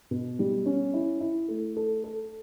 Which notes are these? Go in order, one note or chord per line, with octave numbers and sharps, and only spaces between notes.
B2
G3
C#4
E4
E4
A3
A4
A4